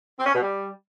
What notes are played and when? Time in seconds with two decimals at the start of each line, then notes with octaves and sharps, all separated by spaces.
0.18 C4
0.26 C#4
0.34 B2
0.42 G3